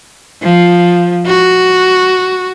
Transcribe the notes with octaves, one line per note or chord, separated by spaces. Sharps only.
F3
F#4